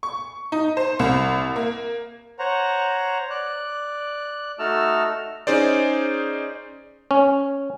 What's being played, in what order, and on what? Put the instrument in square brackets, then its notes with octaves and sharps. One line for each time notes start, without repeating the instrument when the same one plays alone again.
[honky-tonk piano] C#6
D#4
C5
C2
A#3
[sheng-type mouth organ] C5 C#5 F#5 A#5
D5 F#6
A3 D#4 F#4 A5 E6 F6
[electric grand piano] C#4 D#4 G#4 C5 D5
[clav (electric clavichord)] C#4